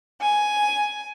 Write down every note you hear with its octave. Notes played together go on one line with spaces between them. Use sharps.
G#5